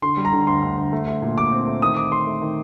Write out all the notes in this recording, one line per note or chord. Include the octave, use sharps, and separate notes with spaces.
D3 C6
G3
A#5
D3
D2 C6
D2
D2
A3
A3
A#2
A#2 D6
C4
A3
D#3 D#6
C4 D6
A3 C6
A3
D#3